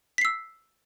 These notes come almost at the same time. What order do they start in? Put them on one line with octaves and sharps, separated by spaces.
B6 C7 E6